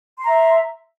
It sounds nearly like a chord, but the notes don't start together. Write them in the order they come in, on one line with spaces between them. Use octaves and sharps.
C6 A#5 E5